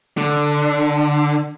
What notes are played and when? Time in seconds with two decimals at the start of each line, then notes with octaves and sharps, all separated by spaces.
0.17 D3